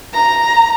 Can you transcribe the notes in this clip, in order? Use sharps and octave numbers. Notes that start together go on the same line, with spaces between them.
A#5